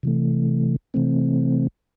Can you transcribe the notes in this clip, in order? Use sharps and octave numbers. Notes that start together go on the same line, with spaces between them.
C3 E3 A3
C3 E3 A3 C4